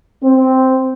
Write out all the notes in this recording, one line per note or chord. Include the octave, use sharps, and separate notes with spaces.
C4